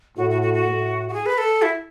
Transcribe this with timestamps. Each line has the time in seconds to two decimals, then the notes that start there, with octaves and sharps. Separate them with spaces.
0.17 A2 F#4
0.30 F#4
0.42 F#4
0.54 F#4
0.65 A2
1.09 F#4
1.13 G#4
1.26 B4
1.38 A4
1.62 E4